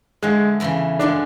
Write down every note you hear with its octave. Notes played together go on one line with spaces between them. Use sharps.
D3 F3 G#3 A3
E2 C#3 E3 A3
F#2 D3 F3 G#3 D4